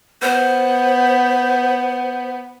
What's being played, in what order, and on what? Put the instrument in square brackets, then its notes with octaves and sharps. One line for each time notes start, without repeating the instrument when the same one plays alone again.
[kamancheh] B3 [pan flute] C5